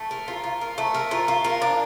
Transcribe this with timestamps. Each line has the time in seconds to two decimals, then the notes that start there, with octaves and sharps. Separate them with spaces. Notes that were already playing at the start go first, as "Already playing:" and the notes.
Already playing: A3
0.11 A#4
0.28 F4
0.44 F4
0.61 A#4
0.78 A3
0.94 A#4
1.11 F4
1.28 F4
1.44 A#4
1.62 D4